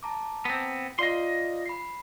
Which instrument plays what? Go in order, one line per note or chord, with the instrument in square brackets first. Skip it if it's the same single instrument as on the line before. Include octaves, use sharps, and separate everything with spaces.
[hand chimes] A5 A#5 D6
[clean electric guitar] B3 C4
[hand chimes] F4 D5 F5 [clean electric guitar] D#5 C6
[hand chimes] B5 C7